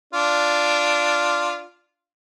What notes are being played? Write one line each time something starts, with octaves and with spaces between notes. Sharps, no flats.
D4 F4